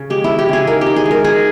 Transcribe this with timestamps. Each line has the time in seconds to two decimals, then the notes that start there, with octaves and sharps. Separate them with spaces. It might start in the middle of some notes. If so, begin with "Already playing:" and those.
Already playing: C#3
0.10 G#3 G4
0.24 E4
0.29 C#3
0.39 G4
0.49 C#3 G#4
0.67 D#4 A#4
0.81 D#4 G4
0.96 G#4
1.06 G#3
1.11 A#4
1.24 D#4 G#4